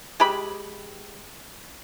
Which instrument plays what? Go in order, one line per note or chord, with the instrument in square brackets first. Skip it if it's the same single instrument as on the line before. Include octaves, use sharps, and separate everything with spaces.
[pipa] G#3 G4 B5